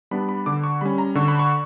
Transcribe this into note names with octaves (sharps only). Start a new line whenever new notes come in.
G3 B3 D4 B5
B5
D3 D6
C#6
G3 C#4 B5
A#5
D3 C#6
B5
C#6